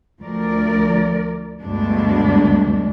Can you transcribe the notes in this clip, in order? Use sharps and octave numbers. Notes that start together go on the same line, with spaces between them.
D2 F3 A#4 D5
D2 G2 B2 G#3 D4